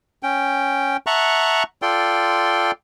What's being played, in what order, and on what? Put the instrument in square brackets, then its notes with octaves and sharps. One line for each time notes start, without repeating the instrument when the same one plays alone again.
[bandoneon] C#4 G5
E5 F#5 A5 A#5 C#6 F#6
F4 A4 D5 G5 C6